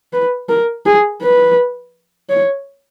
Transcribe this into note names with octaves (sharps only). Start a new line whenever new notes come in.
B4
A#4
G#4
B4
C#5